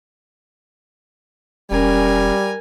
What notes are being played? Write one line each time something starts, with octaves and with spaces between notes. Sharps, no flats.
E1 G3 C#4 A#4 G#5